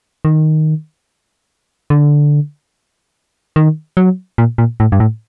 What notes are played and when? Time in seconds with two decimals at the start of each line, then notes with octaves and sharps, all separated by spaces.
0.25 D#3
1.90 D3
3.56 D#3
3.97 F#3
4.38 A#2
4.58 A#2
4.80 A2
4.92 G2
5.00 A2